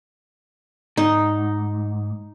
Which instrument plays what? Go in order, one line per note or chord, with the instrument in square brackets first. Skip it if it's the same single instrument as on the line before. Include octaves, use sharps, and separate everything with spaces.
[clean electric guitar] G#2 [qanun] D#4